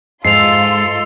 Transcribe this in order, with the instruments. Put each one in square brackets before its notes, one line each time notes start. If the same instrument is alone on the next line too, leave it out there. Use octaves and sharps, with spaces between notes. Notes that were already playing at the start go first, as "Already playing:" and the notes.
[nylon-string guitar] G#2 [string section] F4 C6 [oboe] A4 [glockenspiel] C7 F7